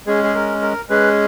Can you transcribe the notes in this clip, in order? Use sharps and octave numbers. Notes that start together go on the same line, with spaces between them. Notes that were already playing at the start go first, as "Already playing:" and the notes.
G#3 C#4 G#4
G#4
A#4
A#4
G#3 C#4 G#4 B4